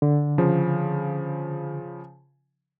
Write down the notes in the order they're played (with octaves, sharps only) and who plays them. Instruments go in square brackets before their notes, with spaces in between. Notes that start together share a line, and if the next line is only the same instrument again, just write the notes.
[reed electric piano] D3
[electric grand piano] C#3 F3